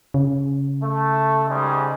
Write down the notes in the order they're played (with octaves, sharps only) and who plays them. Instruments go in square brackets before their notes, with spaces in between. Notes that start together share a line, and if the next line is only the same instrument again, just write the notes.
[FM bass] C#3
[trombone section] A3
G#2 G3 G#3